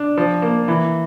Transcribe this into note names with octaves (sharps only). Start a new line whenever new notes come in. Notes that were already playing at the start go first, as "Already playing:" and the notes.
Already playing: D4
F3
A#3
E3